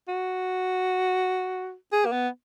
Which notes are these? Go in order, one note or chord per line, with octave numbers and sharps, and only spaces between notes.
F#4
G#4
A#3
B3